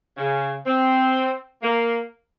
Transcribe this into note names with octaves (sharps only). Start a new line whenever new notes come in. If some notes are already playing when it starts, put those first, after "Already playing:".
C#3
C4
A#3